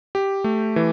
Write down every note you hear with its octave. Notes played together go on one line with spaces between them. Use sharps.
G4
A3
E3